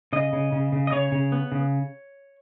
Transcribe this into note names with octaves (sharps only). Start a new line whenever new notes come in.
C#3 D#5
C#3
C#3
C#3
D#5
C#3 C#5
C#3
B3
C#3